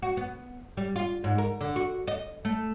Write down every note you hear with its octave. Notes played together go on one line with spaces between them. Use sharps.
F#4
B3
G3
F4
G#2
A#4
D3
F#4
D#5
A3